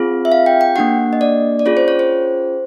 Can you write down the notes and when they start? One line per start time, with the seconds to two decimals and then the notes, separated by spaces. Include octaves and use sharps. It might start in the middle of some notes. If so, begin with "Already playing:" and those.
Already playing: C4 F4 G#4
0.25 E5
0.32 F5
0.46 G5
0.61 G5
0.76 A#3 D4 G4 F#5
1.13 D#5
1.21 D5
1.59 D5
1.66 C#4 F4 G#4 C#5
1.77 C5
1.88 C#5
1.99 C5